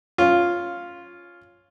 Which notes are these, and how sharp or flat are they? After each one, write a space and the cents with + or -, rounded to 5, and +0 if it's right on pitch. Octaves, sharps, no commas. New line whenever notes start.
C#4 +0 F4 +0